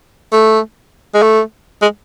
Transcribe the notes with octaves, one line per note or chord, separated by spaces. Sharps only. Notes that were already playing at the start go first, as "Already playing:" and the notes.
A3
G#3
A3
G#3